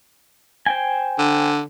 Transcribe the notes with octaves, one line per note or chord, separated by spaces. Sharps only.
C5 G5 G#5
D3